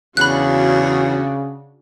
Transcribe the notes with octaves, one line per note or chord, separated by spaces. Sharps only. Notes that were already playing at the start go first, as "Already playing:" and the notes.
E2 C#3 D4 F#4 B5 F#6